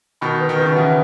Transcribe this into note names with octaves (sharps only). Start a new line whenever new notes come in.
B2 D#3 B5
B4
D#3
C#3 B4
B2 D#3
C#3 E3 F#5